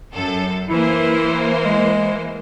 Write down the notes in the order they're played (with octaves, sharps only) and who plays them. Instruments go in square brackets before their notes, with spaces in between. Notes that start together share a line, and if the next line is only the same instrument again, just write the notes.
[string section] F#2 A4
[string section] E3 A#3 C5 [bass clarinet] E4
[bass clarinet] G#3